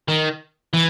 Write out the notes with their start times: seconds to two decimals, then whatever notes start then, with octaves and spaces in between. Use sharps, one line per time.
0.08 D#3
0.73 E3